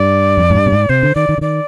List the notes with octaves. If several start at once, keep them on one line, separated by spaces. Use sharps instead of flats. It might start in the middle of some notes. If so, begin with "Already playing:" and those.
Already playing: G2 D5
F2
G#2
G2
B2
G#2
C3 C5
D3
D#3 D5
D#3
D3
D#3 D5